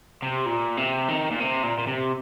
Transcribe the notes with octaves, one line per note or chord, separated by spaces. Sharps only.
C3
A#2
C3
D#3
A#2
C3
A#2
A#2
C3